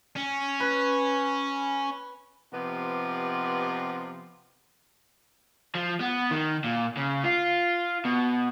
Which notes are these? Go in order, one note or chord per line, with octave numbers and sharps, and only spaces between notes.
C#4
B4
C3 F3 B3 G4 B4 D#5
F3
B3
D#3
A#2
C#3
F4
B2